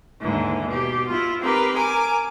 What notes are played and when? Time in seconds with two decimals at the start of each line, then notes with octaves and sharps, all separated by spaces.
0.20 D#2 G#2 D3 E3
0.66 B2 G4
1.07 E4 F4
1.39 C4 D#4 G4 A#4 B4
1.74 A#4 G#5 D6